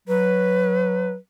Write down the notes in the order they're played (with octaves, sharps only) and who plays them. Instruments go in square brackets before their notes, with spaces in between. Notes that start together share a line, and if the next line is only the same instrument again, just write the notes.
[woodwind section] F#3 [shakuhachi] B4